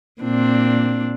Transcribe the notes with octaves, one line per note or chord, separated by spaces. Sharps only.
A#2 C4 D4